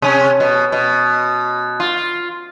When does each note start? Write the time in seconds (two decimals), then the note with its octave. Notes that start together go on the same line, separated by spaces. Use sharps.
0.02 C3 C#4
0.40 B2
0.72 B2
1.80 F4